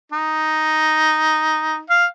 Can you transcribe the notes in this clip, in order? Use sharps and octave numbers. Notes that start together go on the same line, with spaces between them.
D#4
F5